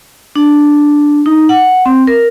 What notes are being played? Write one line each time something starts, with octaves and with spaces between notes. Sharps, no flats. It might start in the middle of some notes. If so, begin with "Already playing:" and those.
D4
D#4
F#5
C4
A#4